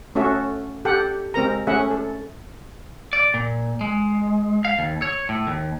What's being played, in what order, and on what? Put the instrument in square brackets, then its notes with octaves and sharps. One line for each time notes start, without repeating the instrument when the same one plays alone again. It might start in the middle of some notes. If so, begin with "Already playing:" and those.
[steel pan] A3 C#4 F#4 A4 E5
G4 A4 F#5 G5
G#3 C4 A#4 A#5
A3 C#4 G#4 E5 F#5
A4
[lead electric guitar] D5
A#2
G#3
F5
D#2
C#5
A2
D#2